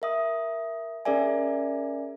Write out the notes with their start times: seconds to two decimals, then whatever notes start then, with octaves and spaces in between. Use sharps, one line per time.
0.02 A#4 E5 D#6
1.05 C#4 G#4 A#4 D5 E5 G#5